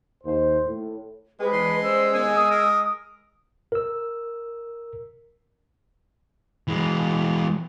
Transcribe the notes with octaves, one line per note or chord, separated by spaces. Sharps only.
D#2 C5
A2
G#3 C4 G4 G#4 B4
E2 E3 D4 C6
G3 C#4 C5 E6
D#2 B3 G#4 G#5
D#6
A#4
A#4 E6
E3 G#3